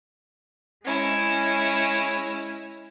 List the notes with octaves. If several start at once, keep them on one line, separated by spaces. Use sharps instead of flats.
G#3 C#4 E4